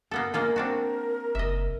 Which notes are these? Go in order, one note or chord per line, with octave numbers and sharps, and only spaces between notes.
A#3 B3 A4
G#3 A#3 F4 A#4
C4 D4 F#4
F#1 D#5 E5